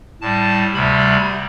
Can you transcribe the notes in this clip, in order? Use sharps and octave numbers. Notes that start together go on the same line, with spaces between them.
A2 G3 A5
D2 C3 G3 B5